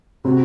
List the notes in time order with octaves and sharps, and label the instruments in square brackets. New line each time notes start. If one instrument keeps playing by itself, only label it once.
[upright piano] C3 C4 [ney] F#4